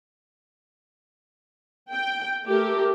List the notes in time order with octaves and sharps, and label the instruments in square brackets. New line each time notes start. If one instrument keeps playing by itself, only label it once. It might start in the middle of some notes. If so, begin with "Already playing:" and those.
[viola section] G5
A3 G4 A#4